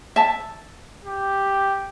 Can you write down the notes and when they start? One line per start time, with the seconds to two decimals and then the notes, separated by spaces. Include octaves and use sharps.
0.16 E5 A5
1.04 G4